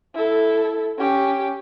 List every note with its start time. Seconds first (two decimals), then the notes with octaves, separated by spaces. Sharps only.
0.15 E4 A4
0.98 C#4 G4